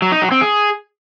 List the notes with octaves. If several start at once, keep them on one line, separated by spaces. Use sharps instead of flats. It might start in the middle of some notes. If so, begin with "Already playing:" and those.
F#3
D#4
F#3
C4
G#4